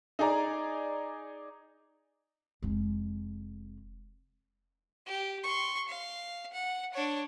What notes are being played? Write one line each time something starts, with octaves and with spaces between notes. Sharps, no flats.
D#4 G#4 D5 A#5
F1 G#3
G4
C6 C#6
F5
F#5
D4 C#5